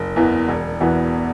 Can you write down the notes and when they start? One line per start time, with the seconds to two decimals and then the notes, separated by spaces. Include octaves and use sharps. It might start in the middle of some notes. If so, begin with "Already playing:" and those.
Already playing: F#1
0.16 E2 E3 B3
0.48 E1
0.81 E2 E3 B3 F#4